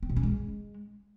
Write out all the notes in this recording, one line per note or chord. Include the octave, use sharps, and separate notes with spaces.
C4
B2
C#4
G#3